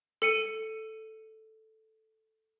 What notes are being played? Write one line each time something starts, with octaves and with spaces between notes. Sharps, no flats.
A4 C#7 D#7